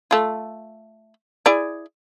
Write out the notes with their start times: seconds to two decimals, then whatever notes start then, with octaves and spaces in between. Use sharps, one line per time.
0.11 A3 F4
1.46 E4 G#4 D5